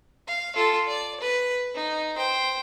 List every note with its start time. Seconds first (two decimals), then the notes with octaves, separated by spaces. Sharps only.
0.27 F5
0.56 F4 A4
0.87 D5
1.20 B4
1.75 D#4
2.17 C5 G5